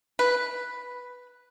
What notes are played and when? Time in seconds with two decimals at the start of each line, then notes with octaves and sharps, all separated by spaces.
0.19 B4